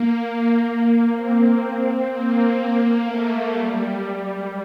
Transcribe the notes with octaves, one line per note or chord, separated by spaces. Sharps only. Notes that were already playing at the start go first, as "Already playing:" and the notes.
Already playing: A#3
A#3
C4
A#3
A3
G3